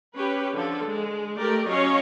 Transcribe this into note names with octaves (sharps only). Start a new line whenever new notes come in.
C#4 G4 B4
D3 F3 A4
G#3
A3 G4 A#4 D5
F#3 C#4 C#5 D#5 F5